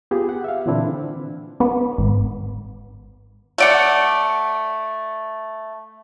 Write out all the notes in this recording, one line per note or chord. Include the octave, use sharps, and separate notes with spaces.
B3 F4 G4 G#4
F#5
E5 F5
A#2 D3 E3 C4 D4 E4
B3
G#1
A3 D5 F#5